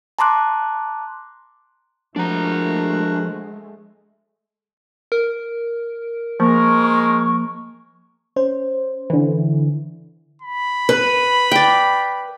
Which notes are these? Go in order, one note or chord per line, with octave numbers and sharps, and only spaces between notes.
A5 A#5 C6 D6 F#6
F3 G#3 A3 D4 F#4 A#4 A#5
A#4
F3 G#3 A#3 A#4 C#6
C#4 C5
D3 E3
B5
B4
D5 G5